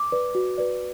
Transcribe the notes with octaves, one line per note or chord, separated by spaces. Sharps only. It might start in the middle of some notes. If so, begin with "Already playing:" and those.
Already playing: D6
B4 D5
F#4
B4 D5